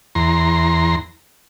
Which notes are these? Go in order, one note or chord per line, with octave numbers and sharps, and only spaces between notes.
E2 A#5 C6